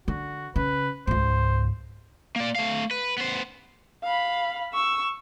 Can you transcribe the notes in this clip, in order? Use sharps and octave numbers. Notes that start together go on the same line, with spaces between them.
D3 F#4
C#3 B4
C#2 G#2 C5
A#3 D5
A3 F5
B4
B3 C5
F5 B5
C#6 E6